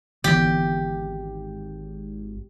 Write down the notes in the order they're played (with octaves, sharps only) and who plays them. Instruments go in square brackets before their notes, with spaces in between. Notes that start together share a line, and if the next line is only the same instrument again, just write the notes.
[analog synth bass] G#1 [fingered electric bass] D3 E3 B3 [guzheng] G4